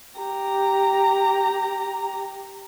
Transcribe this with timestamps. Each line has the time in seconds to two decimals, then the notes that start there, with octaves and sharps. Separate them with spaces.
0.19 G4 A#5